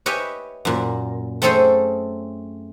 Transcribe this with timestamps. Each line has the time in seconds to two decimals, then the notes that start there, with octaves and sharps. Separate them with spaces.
0.06 G4 B4 C#5 D#5 E5 G#5
0.65 F#2 A#2
1.42 A3 C4 C#4 G#4 A4 C5